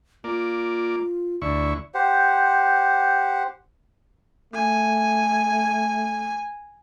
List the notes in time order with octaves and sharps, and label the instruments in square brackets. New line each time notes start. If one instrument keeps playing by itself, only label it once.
[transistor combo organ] A#3 D5 [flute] F4
[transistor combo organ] D2 E4 C#6 [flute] D5
[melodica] G4 C5 F#5
[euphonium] A3 [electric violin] G#5